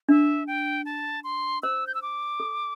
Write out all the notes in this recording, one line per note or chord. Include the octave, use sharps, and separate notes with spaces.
D4 E5
G5
A5
C6
C5 E6
G6
E6
D6
A4